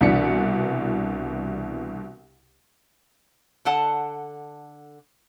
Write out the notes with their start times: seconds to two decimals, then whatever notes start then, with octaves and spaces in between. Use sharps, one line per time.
0.01 C2 B2 E3 D4 B6 C#7
3.65 D3 A4 F#5 A5